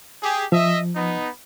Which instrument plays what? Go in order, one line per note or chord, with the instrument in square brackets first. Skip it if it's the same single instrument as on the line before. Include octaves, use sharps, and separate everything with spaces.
[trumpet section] G4 G#4
[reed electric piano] F3 [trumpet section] D#5 E5
[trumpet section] B3 D#4